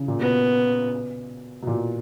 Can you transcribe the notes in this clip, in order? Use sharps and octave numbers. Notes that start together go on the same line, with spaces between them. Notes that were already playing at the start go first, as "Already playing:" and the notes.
Already playing: C#3
A#2
B2 B3
B2
A#2